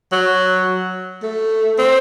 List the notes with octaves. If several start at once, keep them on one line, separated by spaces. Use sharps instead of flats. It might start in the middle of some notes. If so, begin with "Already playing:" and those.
F#3
A3
C4